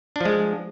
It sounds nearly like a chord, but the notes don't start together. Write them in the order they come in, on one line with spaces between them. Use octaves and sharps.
D4 F3 G#3